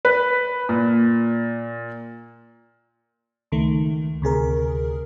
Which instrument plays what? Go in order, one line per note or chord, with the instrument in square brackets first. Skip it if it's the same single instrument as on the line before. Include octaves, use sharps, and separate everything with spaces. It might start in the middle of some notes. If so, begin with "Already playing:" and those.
[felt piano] B4
A#2
[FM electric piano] C#2 D#3 A3
D2 C3 G#4 A#4